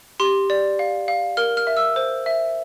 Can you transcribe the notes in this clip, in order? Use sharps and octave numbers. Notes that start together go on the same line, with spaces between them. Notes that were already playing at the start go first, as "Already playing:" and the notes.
G4 C6
D5
F5
F5
A#4 F6
F6
E5
E6
C5
E5